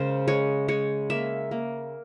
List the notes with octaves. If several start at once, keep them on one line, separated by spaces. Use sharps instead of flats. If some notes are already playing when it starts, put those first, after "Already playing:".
Already playing: C#3 G#3 G#4 A#4 C5
G#3 C#5
G#3 C#5
A#3 E5
A#3